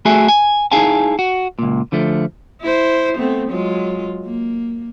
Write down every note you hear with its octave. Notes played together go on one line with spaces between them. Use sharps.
A3 F#4 G#4 A4 E5 G#5
G#5
D#4 E4 G#4 F5 G#5 A5
F#4
C#2 A#2
D3 F3 A3
E4 C5
A3 B3 C4
F#3 G#3 F4
A#3